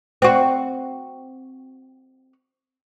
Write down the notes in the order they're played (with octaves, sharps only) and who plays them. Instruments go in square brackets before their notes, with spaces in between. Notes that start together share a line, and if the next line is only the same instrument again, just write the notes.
[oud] C4 F#4